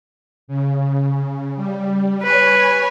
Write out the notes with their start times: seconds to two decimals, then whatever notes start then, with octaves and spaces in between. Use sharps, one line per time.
0.48 C#3
1.56 G3
2.22 B4 C#5 G#5